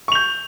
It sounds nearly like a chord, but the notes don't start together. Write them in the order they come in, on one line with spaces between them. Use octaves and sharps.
C#6 F7 G6